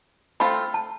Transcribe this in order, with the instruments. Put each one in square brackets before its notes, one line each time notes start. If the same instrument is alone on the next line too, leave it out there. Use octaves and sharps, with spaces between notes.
[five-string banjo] A3 C4 F4 A4 [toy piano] B5
[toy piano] A5